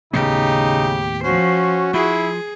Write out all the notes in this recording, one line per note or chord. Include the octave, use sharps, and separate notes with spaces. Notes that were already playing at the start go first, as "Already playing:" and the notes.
D#2 A2 C#3 B3 D#4 G4
F3 C#4 F#4 C5
F3 E4 G#4